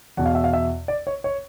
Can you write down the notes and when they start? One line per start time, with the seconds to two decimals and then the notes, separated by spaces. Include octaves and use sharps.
0.17 E2 B2 F#5
0.26 F5
0.35 E5
0.44 F5
0.53 E5
0.88 D5
1.07 C#5
1.24 C#5